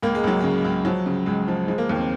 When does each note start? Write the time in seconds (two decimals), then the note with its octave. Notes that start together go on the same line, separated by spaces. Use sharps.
0.02 C#2 A#3
0.15 G#3
0.24 C#2 F#3
0.40 C#3 G#3
0.64 C#2
0.85 F3 F#3
1.06 C#3
1.26 C#2 G#3
1.48 F3
1.68 F3 G#3
1.78 A#3
1.89 D#2 A#3
1.99 C4